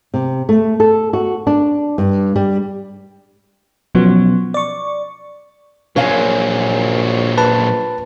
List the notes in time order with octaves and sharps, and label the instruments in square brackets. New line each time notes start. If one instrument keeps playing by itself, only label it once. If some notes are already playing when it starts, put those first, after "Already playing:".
[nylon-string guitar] C3
A3
A4
F#4
D4
G2
G3
[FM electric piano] B2 F3 F#3 B3 C#4
D5 C#6
[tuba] A#1 [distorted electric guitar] A#2 F#3 [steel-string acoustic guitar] C#5 F5 G#5
[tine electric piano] B4 A5